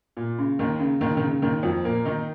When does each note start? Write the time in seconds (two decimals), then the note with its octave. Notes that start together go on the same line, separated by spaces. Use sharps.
0.17 A#2
0.38 C#3
0.59 D#2 D#3
0.79 C#3
1.01 D#2 D#3
1.17 D#3
1.22 C#3
1.42 D#2 D#3
1.63 F2 F3
1.84 A#2 A#3
2.05 D#3 D#4